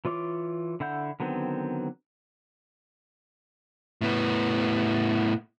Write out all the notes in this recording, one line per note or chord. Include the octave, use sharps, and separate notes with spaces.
E3 F4 C#5 D6
D3 E4 F#5 G6
D3 D#3 F#3 B3 C4
A2 B3